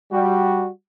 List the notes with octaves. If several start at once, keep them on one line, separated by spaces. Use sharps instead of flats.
G3 F#4